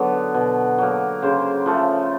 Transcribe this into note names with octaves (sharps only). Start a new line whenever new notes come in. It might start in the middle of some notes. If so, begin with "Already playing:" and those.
Already playing: D3 F#3 B3
B2
F#3 A#3
C#3 C5
F3 A3